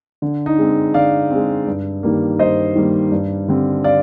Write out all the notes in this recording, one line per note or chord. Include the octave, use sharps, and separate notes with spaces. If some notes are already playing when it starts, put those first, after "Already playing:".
D3
D#4
G#3 C4
D3 D5 F5
G#3 C4
G2
D#3 G3 A#3
G2 C5 D#5
D#3 G3 A#3
G2
D3 G3 C4
D5 F5